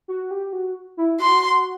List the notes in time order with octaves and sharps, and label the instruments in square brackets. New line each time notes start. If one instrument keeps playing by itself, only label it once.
[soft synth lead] F#4
G4
F#4
E4
[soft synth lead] F#4 [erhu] C6